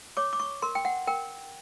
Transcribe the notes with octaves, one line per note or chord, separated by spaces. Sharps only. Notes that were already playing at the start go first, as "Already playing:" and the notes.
C#5 D6
D6
C#6
A#4 C6
G5
F#5
A#4 G5